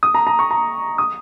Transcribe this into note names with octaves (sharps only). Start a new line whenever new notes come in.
D#6
A#5
A#5
C#6
A#5
D#6